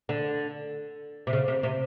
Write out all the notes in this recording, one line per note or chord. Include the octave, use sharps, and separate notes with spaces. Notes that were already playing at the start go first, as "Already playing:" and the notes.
D3
C3
C#3
C3
C3